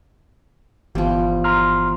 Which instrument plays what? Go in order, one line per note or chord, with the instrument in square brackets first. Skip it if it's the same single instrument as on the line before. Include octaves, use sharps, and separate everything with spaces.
[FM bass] G1 [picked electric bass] E3 B3 [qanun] F3 G3
[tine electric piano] A#5 C6 F6